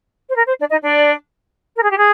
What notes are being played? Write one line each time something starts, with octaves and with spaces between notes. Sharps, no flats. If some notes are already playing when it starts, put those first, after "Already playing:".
C5
A#4
C5
D4 D5
D#4 D#5
D4 D5
A#4
G#4
G4
G#4